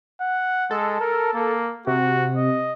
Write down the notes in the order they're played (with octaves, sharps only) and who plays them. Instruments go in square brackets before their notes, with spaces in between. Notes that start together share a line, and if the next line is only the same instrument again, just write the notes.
[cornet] F#5
[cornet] G#3 [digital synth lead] A4
[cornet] A#4
A#3
[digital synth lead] C3 [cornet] F#4
[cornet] D#5